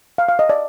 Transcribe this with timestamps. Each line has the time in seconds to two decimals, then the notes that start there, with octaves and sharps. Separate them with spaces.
0.18 F5
0.29 F5
0.39 D#5
0.49 D5